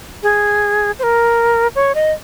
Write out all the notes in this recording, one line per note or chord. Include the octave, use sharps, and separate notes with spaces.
G#4
C5
A#4
C#5
D#5